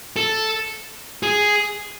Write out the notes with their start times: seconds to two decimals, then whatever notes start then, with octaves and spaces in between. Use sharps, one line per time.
0.16 A4
1.23 G#4